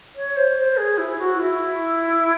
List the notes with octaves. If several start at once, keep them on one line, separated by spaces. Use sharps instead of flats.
C#5
C5
C5
G#4
E4
F#4
E4